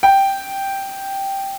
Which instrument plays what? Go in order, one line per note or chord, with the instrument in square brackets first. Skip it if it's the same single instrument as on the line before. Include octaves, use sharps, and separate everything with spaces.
[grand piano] G5